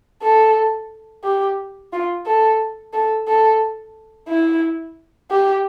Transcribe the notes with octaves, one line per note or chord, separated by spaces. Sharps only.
A4
G4
F4
A4
A4
A4
E4
G4